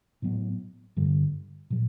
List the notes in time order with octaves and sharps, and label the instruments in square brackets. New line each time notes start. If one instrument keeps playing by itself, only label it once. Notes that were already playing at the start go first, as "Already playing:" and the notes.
[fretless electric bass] A2 F#3 B3
G2 D3 G3
A#2 F#3